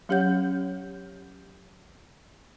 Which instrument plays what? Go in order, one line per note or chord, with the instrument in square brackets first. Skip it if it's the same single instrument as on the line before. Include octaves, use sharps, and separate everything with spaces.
[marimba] F#3 C#4 G4 C#5 F#5 G6